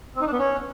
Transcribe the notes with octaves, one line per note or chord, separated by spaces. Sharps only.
C4
D#4
D4
B3
C#4